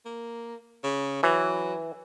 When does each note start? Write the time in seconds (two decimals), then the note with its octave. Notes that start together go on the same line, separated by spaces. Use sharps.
0.06 A#3
0.83 C#3
1.23 E3 F#3